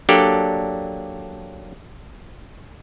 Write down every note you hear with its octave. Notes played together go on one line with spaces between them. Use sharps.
F#3 A#3 D4 G4 A4 D5